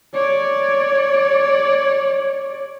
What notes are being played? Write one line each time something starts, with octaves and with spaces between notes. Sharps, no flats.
C#5 D5